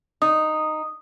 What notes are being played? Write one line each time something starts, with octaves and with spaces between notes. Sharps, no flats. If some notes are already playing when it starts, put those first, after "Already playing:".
D#4 D#6